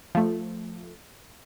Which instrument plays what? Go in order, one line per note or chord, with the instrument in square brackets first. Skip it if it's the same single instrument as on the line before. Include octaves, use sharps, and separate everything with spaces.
[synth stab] F3 A3